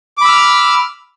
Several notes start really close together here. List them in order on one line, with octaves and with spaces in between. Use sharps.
D6 B5 E6 F6